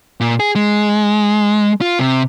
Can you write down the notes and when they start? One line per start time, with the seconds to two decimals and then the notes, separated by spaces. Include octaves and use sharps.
0.20 A#2
0.40 G#4
0.55 G#3
1.81 F4
1.99 C3